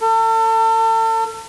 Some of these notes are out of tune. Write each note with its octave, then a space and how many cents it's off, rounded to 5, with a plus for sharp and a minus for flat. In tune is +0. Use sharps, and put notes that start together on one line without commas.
A4 +35